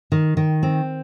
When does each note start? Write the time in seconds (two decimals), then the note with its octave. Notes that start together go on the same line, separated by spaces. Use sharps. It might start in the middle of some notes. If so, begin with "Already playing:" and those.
0.12 D#3
0.37 D#3
0.63 C4